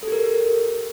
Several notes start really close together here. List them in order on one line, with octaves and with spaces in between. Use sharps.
A4 G4 A#4